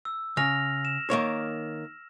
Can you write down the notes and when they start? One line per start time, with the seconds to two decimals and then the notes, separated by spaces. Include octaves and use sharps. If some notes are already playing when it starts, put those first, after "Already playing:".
0.05 E6
0.37 C#3 F6 A#6 F7
0.85 E7
1.10 D#3 A#3 C#5